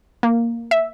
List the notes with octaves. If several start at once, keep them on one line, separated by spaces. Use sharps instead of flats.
A#3
E5